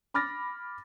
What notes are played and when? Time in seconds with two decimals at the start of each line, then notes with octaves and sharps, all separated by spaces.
0.14 B5 D6 F6 A6 A#6